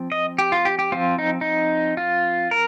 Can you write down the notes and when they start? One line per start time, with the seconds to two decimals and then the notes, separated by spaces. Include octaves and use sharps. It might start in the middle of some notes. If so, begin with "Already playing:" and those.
Already playing: F3 C4
0.12 D#5
0.38 G4
0.52 F4
0.65 G4
0.79 G4
0.92 F3 C4 F4
1.19 D#4
1.41 D#4
1.97 F4
2.51 A#4